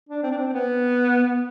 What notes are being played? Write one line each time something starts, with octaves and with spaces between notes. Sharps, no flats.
D4
C4
D4
C4
B3